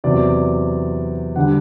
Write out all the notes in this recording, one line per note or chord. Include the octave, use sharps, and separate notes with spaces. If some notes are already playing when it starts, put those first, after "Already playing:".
E2 C3 F#3 D5
D3 G3 F#5